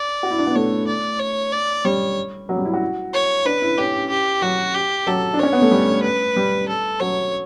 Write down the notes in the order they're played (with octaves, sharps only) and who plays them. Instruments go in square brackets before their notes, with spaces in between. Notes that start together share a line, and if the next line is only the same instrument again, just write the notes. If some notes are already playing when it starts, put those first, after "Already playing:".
Already playing: [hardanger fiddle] D5
[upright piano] F#4
E4
D4
B3
[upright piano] A3 [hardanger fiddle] C#5
[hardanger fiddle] D5
C#5
D5
[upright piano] G3 [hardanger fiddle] C#5
[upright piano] F#3
G3
E4
F#4
[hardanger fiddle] C#5
[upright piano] D4 [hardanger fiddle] B4
[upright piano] E4
[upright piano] C#4 [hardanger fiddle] G4
[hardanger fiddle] G4
[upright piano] F#3 [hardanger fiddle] F#4
[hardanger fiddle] G4
[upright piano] F#3 [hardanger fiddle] A4
[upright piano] D4
[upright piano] C#4 [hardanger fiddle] C#5
[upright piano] B3
A3
G3
[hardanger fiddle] B4
[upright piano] G3
[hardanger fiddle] A4
[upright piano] F#3 [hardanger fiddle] C#5